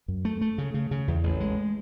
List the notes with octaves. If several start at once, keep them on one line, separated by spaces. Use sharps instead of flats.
F#2
A3
A3
C#3
C#3
C#3
E2
A1
G#3